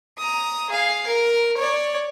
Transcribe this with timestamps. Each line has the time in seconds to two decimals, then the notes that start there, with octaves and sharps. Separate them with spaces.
0.18 A#5 D#6
0.70 G#4 F5
1.07 A#4
1.57 C#5 D5